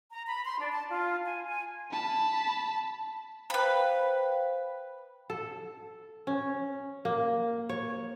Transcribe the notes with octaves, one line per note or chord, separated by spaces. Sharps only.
A#5
B5
C6
D4
A5
F4
G#5
G#5
A5 B5
B4 C5 F5 G5 B5
A4
C#4
A#3
C#5